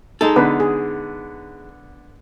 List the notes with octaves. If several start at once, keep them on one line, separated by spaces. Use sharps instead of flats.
G#3 D#4 A4
D3 B3 B4
G#4